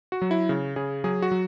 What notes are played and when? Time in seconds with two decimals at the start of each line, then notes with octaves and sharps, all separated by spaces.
0.12 F#4
0.22 F#3
0.31 E4
0.49 C#3
0.76 C#3 G#4
1.04 F#3 G#4
1.22 F#4
1.31 F#3